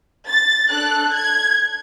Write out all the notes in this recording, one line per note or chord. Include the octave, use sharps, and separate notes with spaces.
A6
D4 A4 F#6
G#6